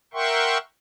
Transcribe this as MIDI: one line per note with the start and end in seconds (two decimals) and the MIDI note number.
0.14 0.58 70
0.14 0.58 76
0.14 0.58 78
0.14 0.58 79
0.14 0.58 84
0.14 0.58 85